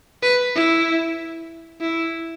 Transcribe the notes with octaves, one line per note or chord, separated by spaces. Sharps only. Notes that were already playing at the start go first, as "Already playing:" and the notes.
B4
E4
E4